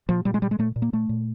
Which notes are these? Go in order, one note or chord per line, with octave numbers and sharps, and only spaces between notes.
A#2 F3
A#2 G3
G#3
A#2 G3
G#3
A#2 A3
A#2
A#3
A#2 A3
A#2